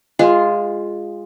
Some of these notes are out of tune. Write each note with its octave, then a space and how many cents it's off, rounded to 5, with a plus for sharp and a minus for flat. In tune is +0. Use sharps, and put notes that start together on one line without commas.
G#3 -15 F4 +0